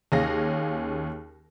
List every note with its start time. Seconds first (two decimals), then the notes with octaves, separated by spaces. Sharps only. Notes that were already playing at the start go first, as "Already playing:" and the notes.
0.12 D#2 C#4 G#4 F5 A#6